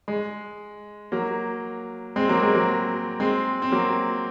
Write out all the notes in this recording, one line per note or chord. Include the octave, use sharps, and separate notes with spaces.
G#3
F#3 A#3
G#3 C4
F#3 A#3
G#3 C4
F#3 A#3
G#3 C4
C4
F#3 A#3